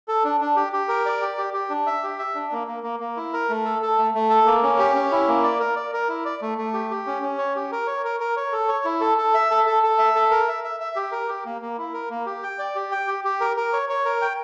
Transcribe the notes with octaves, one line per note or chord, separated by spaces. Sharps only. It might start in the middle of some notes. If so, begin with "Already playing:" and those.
A4
D4
D4
G4
G4
A#4
D5
G4
G4
G4
D4
E5
G4
E5
D4
A#3
A#3
A#3
A#3
E4
A#4
A3
A4
A4
A3
A3
A4
A#3
C#4
G4
C#4
E4
A#3
D5
A#4
D5
A#4
E4
D5
A3
A3
G4
G4
C#4
C#4
C#5
G4
A#4
C#5
A#4
A#4
C#5
A4
C#5
E4
A4
A4
E5
A4
A4
A4
E5
A4
A#4
E5
E5
E5
G4
A#4
G4
A#3
A#3
E4
A#4
A#3
G4
G5
D5
G4
G5
G4
G4
A#4
A#4
C#5
C#5
A#4
G5